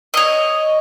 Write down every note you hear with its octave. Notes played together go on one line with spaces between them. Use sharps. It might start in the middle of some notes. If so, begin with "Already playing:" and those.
C#5 D#5